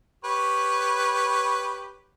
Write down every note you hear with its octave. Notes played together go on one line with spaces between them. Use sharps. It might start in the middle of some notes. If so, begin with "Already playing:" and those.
G4 B4 C#5